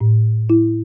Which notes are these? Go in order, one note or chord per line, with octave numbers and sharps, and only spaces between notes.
A2
E4